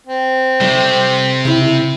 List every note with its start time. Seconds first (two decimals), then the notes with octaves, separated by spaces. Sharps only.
0.07 C4
0.61 C3 G3 A3
1.45 C#3 E4 G5